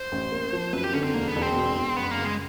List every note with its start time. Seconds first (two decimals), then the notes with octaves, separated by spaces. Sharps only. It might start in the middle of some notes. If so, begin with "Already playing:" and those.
Already playing: C5
0.12 A1
0.32 A#3
0.53 F3
0.73 F#2 B4
0.84 G4
0.93 D3 C#4
1.04 C4
1.14 E1 A#3
1.28 B3
1.36 E1
1.42 C4
1.56 B2
1.76 E1
1.96 F#1 B3
2.11 A#3
2.17 C#3
2.24 G#3